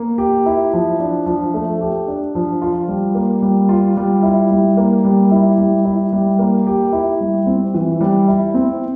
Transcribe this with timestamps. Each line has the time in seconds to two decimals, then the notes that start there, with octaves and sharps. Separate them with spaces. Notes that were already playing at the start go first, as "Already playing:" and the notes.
Already playing: A#3
0.18 G4
0.46 E4
0.73 F3
1.00 D4
1.26 F3
1.54 A3
1.81 G4
2.08 D4
2.35 F3
2.62 F4
2.88 G3
3.15 A#3
3.42 G3
3.69 F4
3.97 G3
4.23 E4
4.51 G3
4.77 A#3
5.05 G3
5.31 E4
5.58 G3
5.85 E4
6.13 G3
6.39 A#3
6.67 G4
6.92 E4
7.21 G3
7.46 C4
7.74 E3
8.01 G3
8.28 E4
8.54 C4